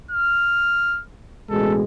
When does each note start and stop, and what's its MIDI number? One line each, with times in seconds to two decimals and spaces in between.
0.11 1.02 89
1.50 1.82 33
1.50 1.82 47
1.50 1.82 56
1.50 1.75 69